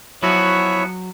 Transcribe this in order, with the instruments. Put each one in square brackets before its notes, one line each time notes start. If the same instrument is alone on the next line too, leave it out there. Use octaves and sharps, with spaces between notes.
[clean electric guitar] F3 B3 F#4 [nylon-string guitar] F#3 [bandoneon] E4 C#5 E5